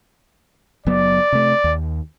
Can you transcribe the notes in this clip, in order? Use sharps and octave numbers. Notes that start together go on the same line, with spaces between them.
F#1 F#3 B3 D5
C3 A3
D#2